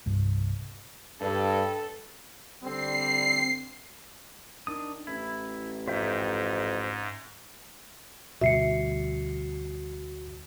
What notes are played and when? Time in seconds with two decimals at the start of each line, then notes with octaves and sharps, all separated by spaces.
0.06 C2 G2
1.22 G2 A4
2.63 D3 G3 C4 C7
4.67 D#3 D4 D#6
5.07 A1 E4
5.88 F2 G#2 C5 E5 G5
8.41 D2 B2 G3 F#4 E5 C7 C#7